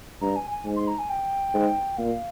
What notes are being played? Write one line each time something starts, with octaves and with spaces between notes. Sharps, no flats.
G2 A#5
G#5
G#5
G#2
C6
A#5
G#5
G5
G#2
A#2 F5